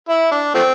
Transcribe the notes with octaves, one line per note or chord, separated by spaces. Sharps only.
E4
D4
F3 A3 C4